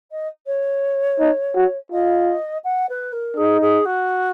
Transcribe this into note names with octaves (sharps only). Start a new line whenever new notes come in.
D#5
C#5
D#4
F#4
F4 D#5
F#5
B4
A#4
D#4 G#4
G#4
F#4